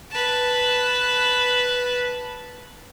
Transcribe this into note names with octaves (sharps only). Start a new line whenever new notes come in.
B4 A5